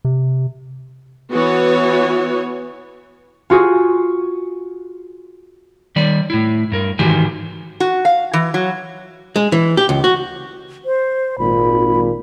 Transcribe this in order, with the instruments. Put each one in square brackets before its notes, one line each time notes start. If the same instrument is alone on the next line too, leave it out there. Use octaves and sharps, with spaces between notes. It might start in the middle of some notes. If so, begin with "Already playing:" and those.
[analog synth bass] C3
[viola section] E3 B3 F#4 C#5
[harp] F4 F#4 G#4
[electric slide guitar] D#3 G3 D5
A2 E4
G2 A#4
G#2 D#3 E3 F#4 G4 G#5
[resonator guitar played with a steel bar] F#4
F5
E3
F#3
[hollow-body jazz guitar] G#3
E3
G4
C#2
F#4
[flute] C5
[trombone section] G#1 A#2 [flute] B5